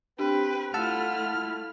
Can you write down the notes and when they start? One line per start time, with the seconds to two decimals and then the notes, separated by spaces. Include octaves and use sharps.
0.19 C4 D4 G4 B4 G5
0.74 A3 E4 F4 F#5 A5 E6 F6